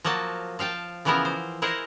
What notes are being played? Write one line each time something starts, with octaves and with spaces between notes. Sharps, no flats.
F3 F#3 A#3 F#4 A5
F3 F5 G5 A5
C#3 E3 F3 B3 E4 A#4
C5
E4 G#4 A#4 C5 D#5 F#5